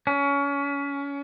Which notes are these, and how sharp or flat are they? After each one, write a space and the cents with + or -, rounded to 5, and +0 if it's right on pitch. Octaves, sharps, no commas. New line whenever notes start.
C#4 +25